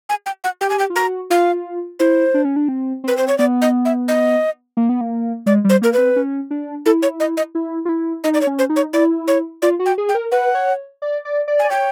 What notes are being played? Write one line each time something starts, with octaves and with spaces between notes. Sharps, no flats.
G#5
G5
F#5
G4 G5
G#5
G5
F4
F#4 A#5
F4 F5
E4 C5
D4
C#4
D4
C4
C4 B4
C5
C#5
B3 D5
D#5
E5
D#5
A#3
B3
A#3
G#3 D5
G3
C5
A#3 A#4
C4 B4
C#4
D4
E4 A4
C#5
D#5
D#5
E4
F4
E4
D#4 D#5
D5
C#5
C#4
C5
D#4
C#5
E4 D5
C#5
F4 D5
F#4
G5
G#4
G5
A#4
B4 F#5
C#5
D5
D5
D5
G#5
D5
C#5 G5